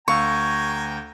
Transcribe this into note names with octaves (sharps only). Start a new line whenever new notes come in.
D2 F5 G5 G#5 A#5 C#6 E6